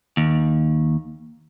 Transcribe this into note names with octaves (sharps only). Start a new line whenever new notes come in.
D#2